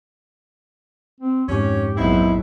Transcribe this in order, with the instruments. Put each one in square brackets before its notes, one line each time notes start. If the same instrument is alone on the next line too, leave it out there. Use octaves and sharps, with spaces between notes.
[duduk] C4
[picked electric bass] F2 G#2 [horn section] C#4 [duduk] G4
[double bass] A#1 F#3 [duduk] B3 [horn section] C4 D#4 E4